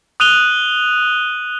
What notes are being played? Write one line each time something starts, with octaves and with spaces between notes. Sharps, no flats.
D#6 F#6 D#7 F7 G7